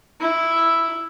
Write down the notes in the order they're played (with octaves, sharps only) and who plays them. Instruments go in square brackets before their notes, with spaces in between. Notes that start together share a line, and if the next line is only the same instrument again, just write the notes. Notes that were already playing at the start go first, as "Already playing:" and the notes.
[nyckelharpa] E4